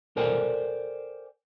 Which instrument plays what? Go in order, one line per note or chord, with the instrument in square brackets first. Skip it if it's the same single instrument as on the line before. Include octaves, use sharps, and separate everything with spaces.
[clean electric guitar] A4 A#4 C5 D5 G5 G#5